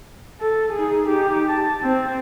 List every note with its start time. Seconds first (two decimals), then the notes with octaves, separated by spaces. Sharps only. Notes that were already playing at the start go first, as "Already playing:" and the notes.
0.41 A4
0.73 D#4 G#4
1.08 D#4 G4
1.48 A5
1.82 C4